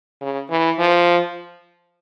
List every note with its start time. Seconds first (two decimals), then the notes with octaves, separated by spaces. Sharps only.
0.22 C#3
0.50 E3
0.79 F3